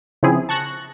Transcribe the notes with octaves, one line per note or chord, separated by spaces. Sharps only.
C#3 E3 F3 C4 E4 G#4
A5 C#6 F#6 A#6